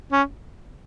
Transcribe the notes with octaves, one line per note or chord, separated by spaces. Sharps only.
C#4